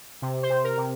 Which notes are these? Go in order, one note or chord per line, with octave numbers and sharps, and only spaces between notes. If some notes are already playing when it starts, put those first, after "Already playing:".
C3
C5
C3
A#4
C3